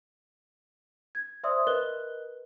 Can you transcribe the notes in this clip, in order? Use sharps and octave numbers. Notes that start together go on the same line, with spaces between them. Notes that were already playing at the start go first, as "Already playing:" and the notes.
G#6
C5 D5 E5 C6 D#6 E6
A#4 B4 D#5 F#6 G7